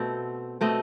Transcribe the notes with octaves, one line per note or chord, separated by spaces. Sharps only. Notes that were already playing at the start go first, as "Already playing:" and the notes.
Already playing: B2 A3 C4
B2 A3 C4 D#5